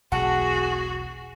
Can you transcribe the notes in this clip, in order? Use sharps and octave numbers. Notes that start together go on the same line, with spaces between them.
E1 B1 E2 F#4 G#4 F#5 A5